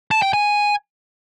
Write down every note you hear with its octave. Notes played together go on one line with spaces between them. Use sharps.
A5
G5
G#5